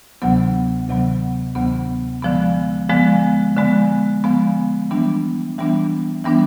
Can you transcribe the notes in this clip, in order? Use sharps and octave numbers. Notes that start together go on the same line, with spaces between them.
D2 C3 D#3 F#3 B3
D2 C3 D#3 F#3 B3
D2 C3 D#3 F#3 B3
D3 F3 G#3 B3
D3 F3 G#3 B3
D3 F3 G#3 B3
D3 F3 G#3 B3
E3 G3 B3 D4
E3 G3 B3 D4
E3 G3 B3 D4